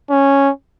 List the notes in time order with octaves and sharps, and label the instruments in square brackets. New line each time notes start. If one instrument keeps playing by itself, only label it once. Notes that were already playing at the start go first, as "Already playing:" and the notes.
[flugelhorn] C#4